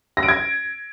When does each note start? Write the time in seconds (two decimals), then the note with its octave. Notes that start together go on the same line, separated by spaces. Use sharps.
0.17 A#6
0.23 D7
0.29 G#6